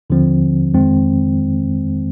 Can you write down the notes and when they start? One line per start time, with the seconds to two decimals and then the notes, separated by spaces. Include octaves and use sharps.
0.10 D#2 D3 F3 C4
0.74 F2 D#3 G#3 C4